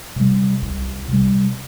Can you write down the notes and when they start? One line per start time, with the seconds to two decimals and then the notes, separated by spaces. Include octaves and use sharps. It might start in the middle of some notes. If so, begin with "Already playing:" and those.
0.16 C3 G3
0.62 C2
1.08 C3 G3